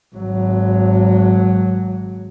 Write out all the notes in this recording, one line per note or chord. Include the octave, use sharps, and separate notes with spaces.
G#1 F#3